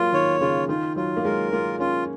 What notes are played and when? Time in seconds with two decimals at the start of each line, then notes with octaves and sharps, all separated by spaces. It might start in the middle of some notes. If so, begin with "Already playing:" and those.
Already playing: F#3 G#3 A#3 F4
0.13 D#3 C#5
0.40 C#3 F4
0.68 D#3 F4
0.96 F#3 F4
1.17 A#3
1.24 G#3 A#4
1.52 A#3 F4
1.80 C#4 F4